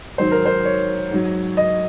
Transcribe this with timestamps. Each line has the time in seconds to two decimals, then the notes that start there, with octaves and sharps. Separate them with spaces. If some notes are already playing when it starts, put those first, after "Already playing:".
0.18 G#2 D#3 F#3 C5
0.32 A#4
0.45 C5
0.65 C#5
1.11 G#2 F#3
1.57 D#5